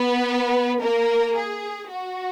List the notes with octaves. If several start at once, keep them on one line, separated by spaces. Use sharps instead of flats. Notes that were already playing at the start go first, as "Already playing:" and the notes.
Already playing: B3 B4
A#3 A#4
G#4
F#4